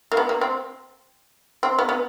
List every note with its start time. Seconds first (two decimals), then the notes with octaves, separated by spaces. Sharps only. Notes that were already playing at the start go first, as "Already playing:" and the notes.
0.12 A#3
0.17 B3
0.29 A#3
0.41 C4
1.63 C4
1.79 B3
1.89 B3